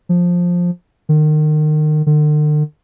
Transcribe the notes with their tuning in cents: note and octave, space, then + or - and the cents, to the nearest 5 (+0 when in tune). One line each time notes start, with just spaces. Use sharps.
F3 +10
D#3 -30
D3 +45